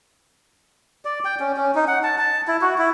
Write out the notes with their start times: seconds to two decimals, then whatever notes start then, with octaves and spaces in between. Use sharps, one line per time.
1.05 D5
1.25 G5
1.40 C#4
1.57 C#4
1.75 D#4
1.88 F#5
2.03 A5
2.18 A5
2.48 E4
2.61 F#4
2.78 E4